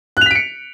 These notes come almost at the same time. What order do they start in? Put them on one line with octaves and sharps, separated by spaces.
F#6 F7 B6 D7 C#7